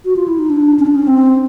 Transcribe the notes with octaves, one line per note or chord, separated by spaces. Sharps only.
F#4
F4
E4
D#4
D4
C#4
D4
C#4
C4